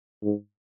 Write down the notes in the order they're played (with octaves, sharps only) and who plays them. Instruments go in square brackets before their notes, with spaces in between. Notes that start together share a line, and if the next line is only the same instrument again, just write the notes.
[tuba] G#2